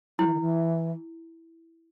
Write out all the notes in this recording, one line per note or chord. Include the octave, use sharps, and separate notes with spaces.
F#3 E4
E3
D#3
E3